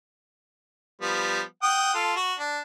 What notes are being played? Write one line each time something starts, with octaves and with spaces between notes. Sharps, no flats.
F3 G3 B3
F#5 G5 D#6
F4 A4
F#4
D4